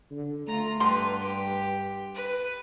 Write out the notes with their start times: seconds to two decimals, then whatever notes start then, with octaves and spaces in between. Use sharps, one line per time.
0.11 D3
0.48 A3 F4 A#5
0.80 G2 D3 G3 B4 C6
1.22 G4
2.15 B4